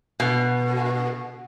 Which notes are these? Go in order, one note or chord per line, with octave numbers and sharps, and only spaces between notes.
B2